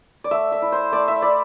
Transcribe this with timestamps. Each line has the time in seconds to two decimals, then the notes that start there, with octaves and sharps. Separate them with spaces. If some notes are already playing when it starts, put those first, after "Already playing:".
0.24 D5
0.31 A3 E5
0.52 E5
0.62 E4
0.72 C5
0.92 A3 D5
1.08 E5
1.22 E4 D5